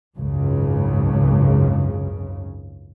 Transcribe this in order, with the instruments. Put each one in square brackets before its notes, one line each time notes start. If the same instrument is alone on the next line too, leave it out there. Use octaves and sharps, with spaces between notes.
[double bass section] G#1 C#2 F#2 C#3